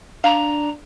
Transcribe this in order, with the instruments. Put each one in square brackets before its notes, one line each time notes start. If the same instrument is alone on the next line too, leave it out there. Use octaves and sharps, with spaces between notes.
[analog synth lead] D4 [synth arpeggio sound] F5 [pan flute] A#5